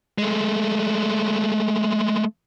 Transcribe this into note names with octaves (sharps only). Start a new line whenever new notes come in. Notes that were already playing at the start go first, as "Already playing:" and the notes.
G#3 A3